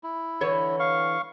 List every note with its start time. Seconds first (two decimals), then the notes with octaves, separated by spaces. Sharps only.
0.04 E4
0.41 D3 E3 C#5
0.80 F5 C#6